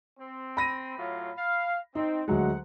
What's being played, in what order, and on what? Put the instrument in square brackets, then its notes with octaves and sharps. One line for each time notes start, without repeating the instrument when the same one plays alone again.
[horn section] C4
[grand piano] B5 A#6 D#7
[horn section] A2 F#3 F4
F5
[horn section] C4 [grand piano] D#4
[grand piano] D2 F#3 G#3 [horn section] F#5